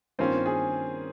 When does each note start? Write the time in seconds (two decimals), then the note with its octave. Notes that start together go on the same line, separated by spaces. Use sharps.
0.19 G2 D#3 A#3 C4 C#4 F4
0.46 G#4